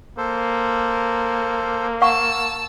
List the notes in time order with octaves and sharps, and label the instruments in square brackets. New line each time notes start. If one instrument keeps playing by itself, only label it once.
[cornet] A#3 [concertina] A4 C5
[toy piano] F5 F#5 C#6 [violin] A5 E6